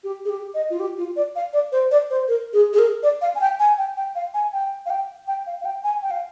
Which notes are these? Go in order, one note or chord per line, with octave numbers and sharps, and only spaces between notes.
G4
G#4
G4
D#5
F4
G4
F4
D5
F5
D5
C5
D5
C5
A#4
G#4
G#4
A#4
D5
F5
G#5
G5
G#5
G5
G5
F5
G#5
G5
F5
G5
G5
F5
F5
G5
G#5
G5
F5